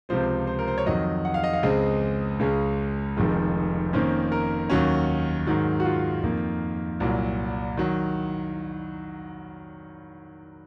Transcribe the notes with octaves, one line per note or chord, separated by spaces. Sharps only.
C#2 C3 F3 C4 C5
C5
A#4
C5
C#5
F2 D#3 F#3 D#5
F#5
F5
D#5
F5
C#2 C#3 G#3 C4 D#5
C#2 C#3 G#3 C#4
F1 F2 D#3 G#3
F2 D#3 A#3 C#4 C5
A#4
D#2 D#3 F#3 C#4
G#2 D#3 F#3
F#4
F4
F2 D#3 A#3
C2 A#2 F#3
D#3 F#3